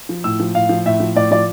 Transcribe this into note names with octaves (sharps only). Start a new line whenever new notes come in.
F3
A2 E6
F3
A2 F5
F3
A2 E5
F3
A2 D5
F3 D5